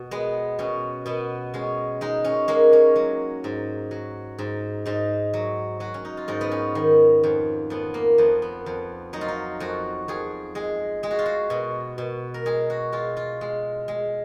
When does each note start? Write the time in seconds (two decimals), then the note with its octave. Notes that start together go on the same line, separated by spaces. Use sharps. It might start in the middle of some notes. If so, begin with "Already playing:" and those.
Already playing: B2
0.11 G#3 B3
0.59 B2 C#4
1.06 B2 B3
1.54 G#3 C#4
2.01 G#3 D#4
2.24 C#4
2.48 G#3 A#3
2.73 C#4
2.96 F#3
3.44 G#2
3.91 F#3
4.38 G#2
4.85 G#2 D#4
5.34 F#3
5.80 F#3 F#4
5.94 C#4
6.05 D#4
6.17 F4
6.28 G#2 D#4
6.41 B3
6.52 C#4
6.75 D#3
7.24 F2
7.70 F2 B3
7.94 A#3
8.18 F2 B3
8.42 B3
8.66 F2
9.13 F#3 D#4
9.21 F4
9.28 D#4
9.60 F2 F#4
10.08 F2 G#4
10.55 G#3 G#4
11.03 G#3 G#4
11.11 F#4
11.19 F4
11.26 F#4
11.50 B2
11.98 B2
12.34 A#4
12.46 G#3 G#4
12.70 F#4
12.93 G#3 F4
13.17 F4
13.41 G#3
13.88 G#3